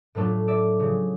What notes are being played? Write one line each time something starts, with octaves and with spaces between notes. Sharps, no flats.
A2 F#3 A3 D4 F4 A4 B4
D5 E5
C#3 F3 G#3